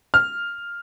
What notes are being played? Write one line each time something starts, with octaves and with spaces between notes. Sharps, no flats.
F6